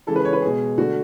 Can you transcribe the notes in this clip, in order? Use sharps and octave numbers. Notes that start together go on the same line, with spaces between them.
C#3 E3 G#3 A4
B4
C#5
B4
B2 G#3 G#4
D3 A3 F#4